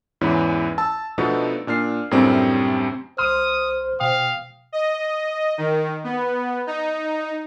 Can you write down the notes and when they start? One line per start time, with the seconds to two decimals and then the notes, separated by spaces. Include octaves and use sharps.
0.21 E2 G#2 E3 C#4 E4
0.78 A5 E6
1.18 B2 F3 A3 B3 D4 D#4
1.67 A#2 D4 F6 C7
2.11 F#2 A2 C3 G3 C4 D4
3.18 C2 C5 C6 D#6 F6
4.00 B2 F5 G5 D#6
4.72 D#5
5.58 D#3
6.04 B3
6.67 D#4